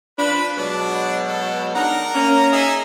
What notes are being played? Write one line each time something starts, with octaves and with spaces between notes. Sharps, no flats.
F3 D4 B4 B5
B2 F#3 G#3 D4
A4
D4 D#4 A#4 F#5 A#5
A#3 C#4
D#4 G#4 E5